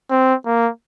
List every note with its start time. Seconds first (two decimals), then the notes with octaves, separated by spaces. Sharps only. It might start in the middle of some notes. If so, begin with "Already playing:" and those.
0.10 C4
0.45 A#3